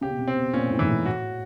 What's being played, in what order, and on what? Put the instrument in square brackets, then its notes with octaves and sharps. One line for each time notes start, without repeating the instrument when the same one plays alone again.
[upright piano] C#3 [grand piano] G4
[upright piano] B2
C3
[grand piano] C4
[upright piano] B2
[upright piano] A#2 [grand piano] C#4
[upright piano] A2
[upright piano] G#2 [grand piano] E3
[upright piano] A2
[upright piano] A2 [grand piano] F#4